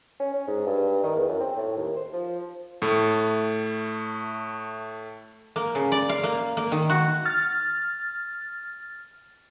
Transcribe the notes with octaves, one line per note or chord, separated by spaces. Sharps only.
C#4
C#4
G#2
G2
D#3
E2
F#2
C4
A2
D#2
C5
F3
A2 A3
A#3
C#3
D5
F5
A#3
A#3
D#3
F#4
F6 A6